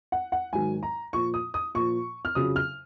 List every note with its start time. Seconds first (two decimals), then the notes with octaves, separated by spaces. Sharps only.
0.12 F#5
0.32 F#5
0.53 G#2 D#3 F#3 G#5
0.83 A#5
1.13 A#2 F3 C#6
1.34 D#6
1.54 D#6
1.75 A#2 F3 C#6
2.25 F6
2.35 F2 C#3 F#3 D#6
2.56 F6